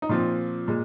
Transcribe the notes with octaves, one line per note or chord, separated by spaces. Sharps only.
D#4
A#2 F3 C4 F4
A#2 G#3